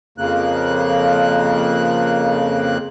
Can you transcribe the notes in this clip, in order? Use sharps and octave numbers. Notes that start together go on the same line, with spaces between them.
F2 C#3 A#3 F#6